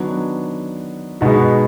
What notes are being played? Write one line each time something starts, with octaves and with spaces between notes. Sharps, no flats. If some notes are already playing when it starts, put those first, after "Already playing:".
Already playing: D#3 F#3 B3 D4
B2 G#3 B3 D#4 F#4